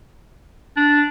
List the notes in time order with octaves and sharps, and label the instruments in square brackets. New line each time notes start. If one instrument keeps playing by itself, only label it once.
[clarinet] D4